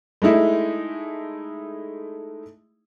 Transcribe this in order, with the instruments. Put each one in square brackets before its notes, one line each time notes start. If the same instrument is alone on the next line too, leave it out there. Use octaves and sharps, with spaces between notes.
[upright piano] G#3 A3 D#4 E4